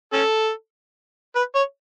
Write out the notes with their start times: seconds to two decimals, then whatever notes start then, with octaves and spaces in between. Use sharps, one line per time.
0.13 C#4 A4
1.36 B4
1.55 C#5